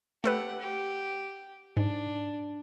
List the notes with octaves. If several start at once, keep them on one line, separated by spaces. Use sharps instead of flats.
A3 G4 A4 B4 F#5
G4
G#2 D4